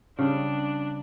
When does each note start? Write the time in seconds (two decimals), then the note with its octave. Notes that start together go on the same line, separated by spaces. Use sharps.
0.19 C#3 G3 D4